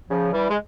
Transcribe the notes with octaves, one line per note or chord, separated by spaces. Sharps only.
C#3 F3
E3 G3
G#3